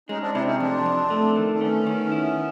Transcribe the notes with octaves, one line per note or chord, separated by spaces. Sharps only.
G#3 C#4 D#4
C4 D4
C3 D4 E4
C#4 D#4
F2 C4 D4
F2
A3
D#3
D4
A3 B3 C#4
D#3
E4